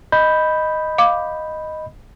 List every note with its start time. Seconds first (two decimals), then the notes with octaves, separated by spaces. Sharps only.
0.12 D#5 B5 G6
0.98 F5 D6